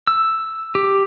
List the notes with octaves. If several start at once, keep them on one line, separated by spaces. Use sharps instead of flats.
E6
G4